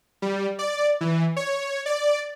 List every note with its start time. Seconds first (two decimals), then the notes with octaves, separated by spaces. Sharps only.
0.22 G3
0.59 D5
1.01 E3
1.36 C#5
1.86 D5